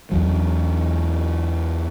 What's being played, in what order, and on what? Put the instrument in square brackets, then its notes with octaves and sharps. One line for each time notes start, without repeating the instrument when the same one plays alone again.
[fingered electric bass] E2 F#3